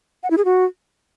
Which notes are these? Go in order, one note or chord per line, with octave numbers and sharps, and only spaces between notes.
F#5
E4
G#4
F#4